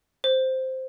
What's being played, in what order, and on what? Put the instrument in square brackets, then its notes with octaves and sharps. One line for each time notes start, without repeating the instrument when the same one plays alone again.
[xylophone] C5